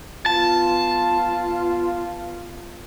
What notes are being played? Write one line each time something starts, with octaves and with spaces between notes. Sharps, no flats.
B3 F4 A5